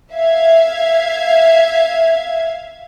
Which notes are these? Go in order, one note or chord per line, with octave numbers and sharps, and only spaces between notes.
E5 F5 G#6